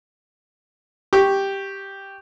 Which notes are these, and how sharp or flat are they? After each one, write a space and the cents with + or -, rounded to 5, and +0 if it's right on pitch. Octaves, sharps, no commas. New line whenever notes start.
G4 +0 C#6 +0